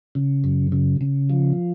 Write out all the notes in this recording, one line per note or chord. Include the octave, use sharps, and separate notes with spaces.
C#3
F#2
C#3
C#3
F3